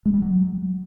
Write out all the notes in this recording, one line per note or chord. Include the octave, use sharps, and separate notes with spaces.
G#3
G3
F#3